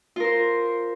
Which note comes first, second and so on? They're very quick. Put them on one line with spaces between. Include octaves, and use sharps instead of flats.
F4 A#4 C5